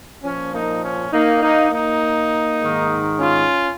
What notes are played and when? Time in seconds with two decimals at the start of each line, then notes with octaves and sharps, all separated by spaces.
0.23 A#2 F3 C#4
0.53 A#3 D#4
0.82 C#4
1.12 A#3 D#4
1.42 A#3 D#4
1.71 A#3 D#4
2.60 G#2 D#3
3.19 C#4 F4